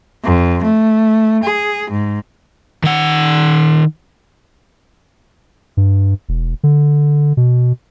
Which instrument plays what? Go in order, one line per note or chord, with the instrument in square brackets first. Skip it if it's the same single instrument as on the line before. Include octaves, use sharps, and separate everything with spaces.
[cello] F2
A3
G#4
G#2
[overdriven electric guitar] D#3 F#5
[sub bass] G2
E1
D3
B2